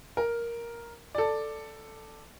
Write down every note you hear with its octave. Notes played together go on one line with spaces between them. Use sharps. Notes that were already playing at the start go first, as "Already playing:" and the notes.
A#4
A4 D5